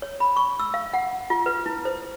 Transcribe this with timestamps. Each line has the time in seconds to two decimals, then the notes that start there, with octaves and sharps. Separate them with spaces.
0.02 C#5
0.20 B5
0.36 C#6
0.60 E6
0.74 F5
0.93 F#5
1.30 F4
1.46 B4
1.66 E4
1.85 C5